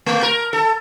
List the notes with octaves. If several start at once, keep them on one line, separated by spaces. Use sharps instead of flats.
A3
A#4
A4